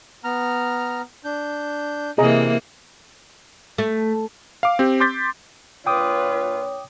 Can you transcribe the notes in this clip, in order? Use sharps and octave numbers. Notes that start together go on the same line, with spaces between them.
B3 A#5 F6
D4 G6
C3 E3 A#3 G#4 D#5 A#5
A3
F5 D6
C4 G4
C6 D6 G6 A6 B6
A#2 D4 F4 B4 C#5 G5 D6 D#6